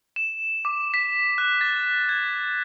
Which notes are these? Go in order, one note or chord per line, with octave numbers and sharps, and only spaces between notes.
E7
D6
B6
F#6
A6
G#6